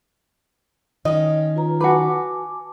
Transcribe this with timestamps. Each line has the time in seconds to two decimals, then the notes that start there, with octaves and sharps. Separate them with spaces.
1.05 D#3 C#4 D#5
1.56 F4 B4 A#5
1.81 F#4 B4 G#5 A5 D6